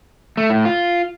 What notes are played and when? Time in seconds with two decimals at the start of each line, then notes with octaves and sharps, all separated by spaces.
0.37 A3
0.50 A2
0.65 F4